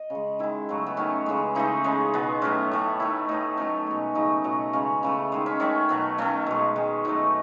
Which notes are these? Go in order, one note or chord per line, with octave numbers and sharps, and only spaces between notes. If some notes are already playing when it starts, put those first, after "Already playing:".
Already playing: D#5
C#3 G#3
D#3 G#3 E4
C#3 F#3 A3
B3
D#3 A3 C#4
C#3 E3 G#3
C#3 E3 A3 D#4
C#3 G#3
B2 G#3 B3
A2 F#3 A3 C#4
A2 E3 A3
D#3 A3 E4
A2 E3 A3 D#4
D#3 F#3 A3 C#4
B2 G#3
C#3 F#3 A3 D#4
B2 F#3 A3
C#3 G#3 C#4
C#3 E3 A3
D#3 G#3
C#4
D#3 A3 C#4
B2 F#3 A3
D#3 A3 C#4
B2 G#3
D#3 G#3
B2 F#3 A3 D#4